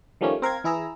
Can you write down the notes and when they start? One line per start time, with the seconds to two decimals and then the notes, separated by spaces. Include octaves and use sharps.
0.21 D#3 F3 G3 A3 A#3 C#4
0.42 C4 A#4 F5 G#6
0.64 E3 E4 G#4 A#5 E6